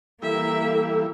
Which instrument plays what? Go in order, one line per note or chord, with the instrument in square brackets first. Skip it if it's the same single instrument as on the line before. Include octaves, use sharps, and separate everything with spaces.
[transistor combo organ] E3 G3 E4 [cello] A#3 [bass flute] A4 [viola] E5